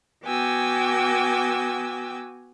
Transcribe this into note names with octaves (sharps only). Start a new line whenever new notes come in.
B3 F#4 G5 G#5 D6 E6